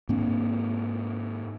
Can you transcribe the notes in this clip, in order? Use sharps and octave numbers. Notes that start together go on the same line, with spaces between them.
G#2 A#3 C4 D4